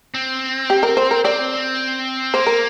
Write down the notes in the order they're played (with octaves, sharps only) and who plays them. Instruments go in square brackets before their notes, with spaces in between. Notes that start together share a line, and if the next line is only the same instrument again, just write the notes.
[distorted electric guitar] C4
[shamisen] G4
A#4
C5
A#4
[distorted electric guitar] C4 [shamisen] D5
[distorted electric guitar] A#3 [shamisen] C5
[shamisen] A#4